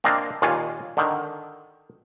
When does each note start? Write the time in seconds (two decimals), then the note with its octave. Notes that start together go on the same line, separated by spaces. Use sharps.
0.04 A#3 C4 D4 A#4 D#5 F5
0.42 D#2 A#2 F4 C#5 G#5
0.97 D3 D#3